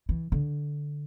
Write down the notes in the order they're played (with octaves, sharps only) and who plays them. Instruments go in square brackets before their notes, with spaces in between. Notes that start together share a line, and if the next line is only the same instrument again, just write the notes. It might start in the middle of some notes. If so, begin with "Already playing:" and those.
[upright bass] E3
D3